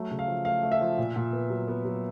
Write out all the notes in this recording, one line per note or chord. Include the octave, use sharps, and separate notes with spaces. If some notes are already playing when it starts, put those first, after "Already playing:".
Already playing: F#3 A3
C#3
F5
F3
A3 F5
A3
E5
F3
A#2
A#2
B3
F#3
B3
F#3